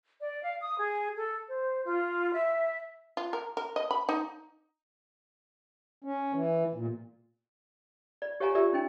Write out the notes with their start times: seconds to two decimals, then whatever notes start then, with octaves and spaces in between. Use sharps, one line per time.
0.20 D5
0.43 F5
0.60 D#6
0.77 G#4
1.16 A4
1.49 C5
1.86 F4
2.32 E5
3.17 F4
3.33 A#4
3.57 A#4
3.76 D#5
3.91 B5
4.09 D#4
6.04 C#4
6.34 E3
6.75 A#2
8.22 D5
8.40 G4 C#5 F5 F#5 G#5 A#5
8.55 F4 G4 D5 E5 E6
8.73 C#4 D#4 G5